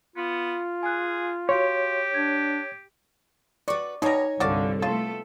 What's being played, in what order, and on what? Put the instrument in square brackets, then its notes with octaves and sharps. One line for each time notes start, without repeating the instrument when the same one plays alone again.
[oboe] B3 [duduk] F4
[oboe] G#4 [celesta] G#5 F#6
[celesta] F#4 F5 C6 [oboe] G4 [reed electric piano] C#5
[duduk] D4 [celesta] G#6
[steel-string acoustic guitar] F#4 B4 [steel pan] D5 C#6
[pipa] B2 G3 [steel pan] D#4 A#5 [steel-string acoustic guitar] C#5 G#5
[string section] C2 G2 D3 [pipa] F#4 D5 F5
[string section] A3 B3 A4 [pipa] F4 [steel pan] C#5 C6